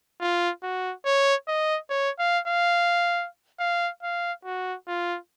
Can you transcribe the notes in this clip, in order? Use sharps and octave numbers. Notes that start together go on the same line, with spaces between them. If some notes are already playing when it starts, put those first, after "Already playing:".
F4
F#4
C#5
D#5
C#5
F5
F5
F5
F5
F#4
F4